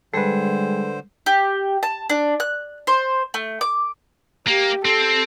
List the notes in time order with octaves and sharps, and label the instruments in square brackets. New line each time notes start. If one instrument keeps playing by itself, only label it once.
[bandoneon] D3 C5 [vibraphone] G3 G#3 G#4 [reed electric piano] A4 B4
[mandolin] G4
A5
D4
F#6
C5
A3
D6
[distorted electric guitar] A#3 [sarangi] G4
[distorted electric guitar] C4 [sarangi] A4